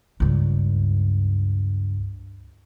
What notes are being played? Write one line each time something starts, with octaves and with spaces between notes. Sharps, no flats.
C#2 G2